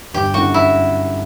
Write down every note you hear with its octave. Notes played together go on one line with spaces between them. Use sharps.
G1 G4
F#2 D3 A3 E4 F#4
E4